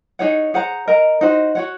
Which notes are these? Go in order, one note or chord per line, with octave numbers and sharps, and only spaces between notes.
D#4 G#4 C#5 F#5
G#4 C5 F#5 A#5
A#4 D#5 A#5
D#4 F#4 C5
F#4 C#5 F#5